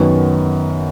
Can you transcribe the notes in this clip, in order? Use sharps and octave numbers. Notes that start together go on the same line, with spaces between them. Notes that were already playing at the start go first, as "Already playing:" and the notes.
Already playing: F#2 D#3 B3 F#4 B4